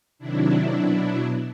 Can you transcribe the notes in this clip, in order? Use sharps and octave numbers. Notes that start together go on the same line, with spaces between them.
C3 D#3 F#3 D4 E4
B2 F#3